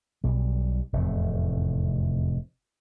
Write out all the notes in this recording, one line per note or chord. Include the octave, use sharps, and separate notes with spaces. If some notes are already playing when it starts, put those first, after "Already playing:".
B1 G3
F1 E2 A2 C3